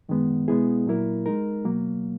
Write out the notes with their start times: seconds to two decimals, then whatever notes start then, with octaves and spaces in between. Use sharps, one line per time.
0.09 F#2 D#3 G#3 B3
0.48 B2 G#3 B3 E4 G#4
0.86 A#2 F#3 A#3 E4 A#4
1.26 G#3 D#4 A#4
1.65 B2 F#3 A#3